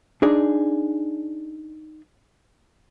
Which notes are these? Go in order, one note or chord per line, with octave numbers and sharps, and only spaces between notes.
D4 D#4 G#4 D5